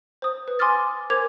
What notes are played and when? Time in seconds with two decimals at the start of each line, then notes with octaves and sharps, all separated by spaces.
0.22 C5 D#6
0.48 B4
0.59 G#5 C6 D6 D#6 F6 A6
1.10 A#4 C5 G#5 D6 G#6 F7